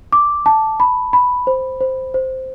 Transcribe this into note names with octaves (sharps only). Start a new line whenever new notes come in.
D6
A5
B5
B5
C5
C5
C5